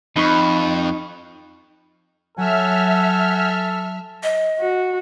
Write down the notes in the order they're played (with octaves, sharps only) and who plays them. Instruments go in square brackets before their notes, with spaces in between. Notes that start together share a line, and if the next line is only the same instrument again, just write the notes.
[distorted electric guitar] F2 [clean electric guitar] D#4 [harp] B5 C#6
[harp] F#3 [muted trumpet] A4 [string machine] E5 F6 [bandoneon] F#5 G#5
[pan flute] D#5
[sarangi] F#4